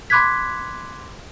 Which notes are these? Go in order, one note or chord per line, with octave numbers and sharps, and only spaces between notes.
B5 C6 D6 F#6 G#6 B6